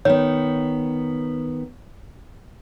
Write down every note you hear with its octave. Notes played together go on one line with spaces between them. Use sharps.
D#3 B3 C#5